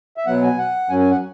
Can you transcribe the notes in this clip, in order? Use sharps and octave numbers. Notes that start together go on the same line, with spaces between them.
E5
B2 F#3 B3 F#5
G#5
F#5
F#2 F#3 C#4 G#5
G#5
F#5